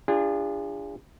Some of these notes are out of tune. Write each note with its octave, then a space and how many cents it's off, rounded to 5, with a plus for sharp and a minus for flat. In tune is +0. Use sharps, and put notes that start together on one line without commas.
D4 +0 F4 -25 G#4 -35